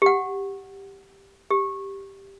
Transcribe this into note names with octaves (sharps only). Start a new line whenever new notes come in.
G4 F#5
G4